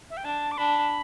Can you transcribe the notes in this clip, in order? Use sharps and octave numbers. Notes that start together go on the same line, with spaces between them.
E5
G5
D4 A5
D6
D4 B5